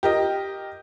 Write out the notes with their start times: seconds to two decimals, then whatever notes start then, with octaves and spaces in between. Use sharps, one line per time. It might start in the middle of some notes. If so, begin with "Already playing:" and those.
0.03 G4 A#4 D#5